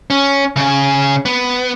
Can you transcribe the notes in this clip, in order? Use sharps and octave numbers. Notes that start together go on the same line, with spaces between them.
C#4
C#3 G#4
B3